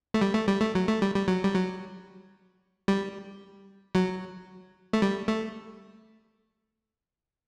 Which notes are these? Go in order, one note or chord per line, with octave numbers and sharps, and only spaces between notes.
A3
G3
A3
G3
A3
F#3
A3
G3
G3
F#3
G3
F#3
G3
F#3
A3
G3
A3